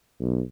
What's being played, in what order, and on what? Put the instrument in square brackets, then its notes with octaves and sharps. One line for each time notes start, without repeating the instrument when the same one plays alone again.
[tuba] B1